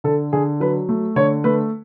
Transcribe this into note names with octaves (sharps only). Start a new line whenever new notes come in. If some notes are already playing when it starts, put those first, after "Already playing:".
D3 A4
D3 G#4
F#3 B4
A3
D3 C#5
A3 B4